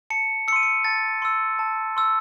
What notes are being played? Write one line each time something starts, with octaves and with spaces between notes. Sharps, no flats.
A5 C#7
C6 E6 C#7 D#7
C#7
A5 A6
C6 E6
A5
C6 E6